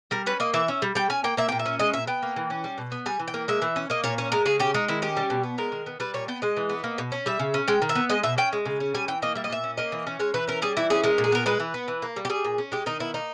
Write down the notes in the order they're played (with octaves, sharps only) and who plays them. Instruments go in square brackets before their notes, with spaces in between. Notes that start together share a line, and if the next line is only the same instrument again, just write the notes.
[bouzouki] G3 A#4
C#4 B4
A#3 D#5
E3 E5
C#4
G3
G3 G5
C#4 G#5
A#3 G5
A#3 E5
A#2 G5
E5
C#4
G#3 D#5
A#2 E5
B3 G5
A#3
E3
C#4
G3
B2
B3
G3 G#5
E3
G5
A#3
G#3 E5
E3
C#4
A#3 D#5
A#2 C#5
C#4 C#5
G#3 A#4
C#3 G#4
C#4 G4
G#3 D#4
D#3 E4
C#4 G4
G3
B2
B3
G#3 A#4
D#3
B3
G3 B4
A#2 C#5
B3 G5
G#3 D#5
E3
B3
A#3
B2
C#4
G3 E5
C#3
C#4
G#3 G5
D#3
E5
B3
G#3 D#5
B2 E5
C#4 G5
G#3
C#3
C#4
G3 G#5
E3 G5
A#3 D#5
G3 E5
D#5
A#2 E5
C#4
A#3 D#5
E3
C#4
G#3 C#5
E3 B4
C#4 A#4
G3 G#4
E3 E4
C#4 G#4
G#3 A#4
A#2
G#4
B3 A#4
G#3 B4
E3
B3
E3
A#3
G3
G4
G3 G#4
A#2
C#4
G#3 G4
D#3 D#4
B3 E4
A#3 D#4